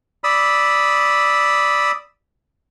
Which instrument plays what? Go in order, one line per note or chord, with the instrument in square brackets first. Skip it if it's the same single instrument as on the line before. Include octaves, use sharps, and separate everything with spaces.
[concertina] D5 B5 D#6 E6